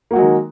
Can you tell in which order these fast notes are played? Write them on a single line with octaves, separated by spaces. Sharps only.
A#3 F#4 F#3 G#3 D#3